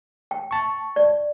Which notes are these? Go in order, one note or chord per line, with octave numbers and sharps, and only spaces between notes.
G5
A5 C#6
D5